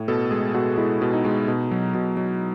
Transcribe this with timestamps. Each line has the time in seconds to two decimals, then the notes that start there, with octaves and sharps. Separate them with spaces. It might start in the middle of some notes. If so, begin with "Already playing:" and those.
Already playing: A2
0.08 B2 A4
0.31 G#3 G#4
0.54 B2 F#4
0.78 G#3 E4
1.02 B2
1.13 D#4
1.25 G#3
1.48 B2
1.71 F#3
1.94 B2
2.17 F#3